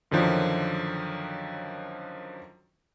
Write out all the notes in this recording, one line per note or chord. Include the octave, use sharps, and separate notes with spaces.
F#2 D3 D#3 F3 F#3